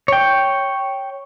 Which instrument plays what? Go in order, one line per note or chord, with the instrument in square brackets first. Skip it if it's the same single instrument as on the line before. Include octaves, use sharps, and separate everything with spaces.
[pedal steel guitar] C#5 G5